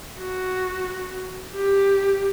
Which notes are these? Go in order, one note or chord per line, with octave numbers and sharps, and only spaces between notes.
F#4
G4